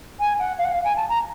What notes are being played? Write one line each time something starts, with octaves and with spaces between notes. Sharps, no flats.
G#5
F#5
F5
F#5
F5
G#5
A5
A#5